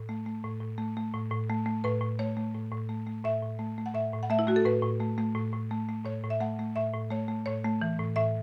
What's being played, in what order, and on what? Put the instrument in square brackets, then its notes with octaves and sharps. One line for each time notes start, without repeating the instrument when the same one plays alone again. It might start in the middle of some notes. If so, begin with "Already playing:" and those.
Already playing: [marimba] A2
A3
A3
A2
A2
A3
A3
A2
A2
A3
A3
A2 B4
A2
A3 C#5
A3
A2
A2
A3
A3
A2 E5
A2
A3
A3
F#5
A2 E5
A2
F#5
A3 E5
E4
A3 F#4
A4
A2 B4
A2
A3
A3
A2
A2
A3
A3
A2 C#5
A2
E5
A3 F#5
A3
A2 E5
A2
A3 C#5
A3
A2 C#5
A3
E3
A2
A2 E5